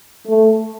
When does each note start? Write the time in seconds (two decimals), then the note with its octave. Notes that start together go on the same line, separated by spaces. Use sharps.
0.27 A3